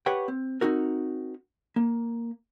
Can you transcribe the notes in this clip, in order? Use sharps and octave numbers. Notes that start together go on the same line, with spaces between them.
G4 B4 C#5 F#5 G5
C4
C4 D#4 F#4 A#4
A#3